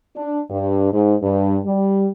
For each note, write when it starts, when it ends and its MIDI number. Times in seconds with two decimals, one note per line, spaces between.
0.16 0.40 62
0.50 0.92 43
0.92 1.14 44
1.23 1.58 43
1.65 2.08 55